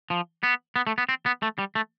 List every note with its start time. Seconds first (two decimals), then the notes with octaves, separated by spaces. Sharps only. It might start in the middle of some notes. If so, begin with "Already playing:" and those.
0.10 F3
0.43 B3
0.76 B3
0.87 A3
0.98 B3
1.09 C4
1.26 B3
1.42 A3
1.59 G3
1.75 A3